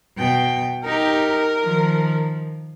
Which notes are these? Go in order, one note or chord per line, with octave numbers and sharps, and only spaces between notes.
B2 G5
D#4 G4 A#4
D#3 F3